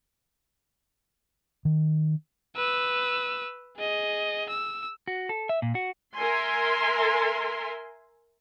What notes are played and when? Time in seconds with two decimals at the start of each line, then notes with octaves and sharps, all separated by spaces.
1.65 D#3
2.57 B4 E6
3.77 G#4 D#5
4.49 E6
5.07 F#4
5.29 A4
5.49 E5
5.62 A#2
5.75 F#4
6.16 A#4 E5 G#5 C6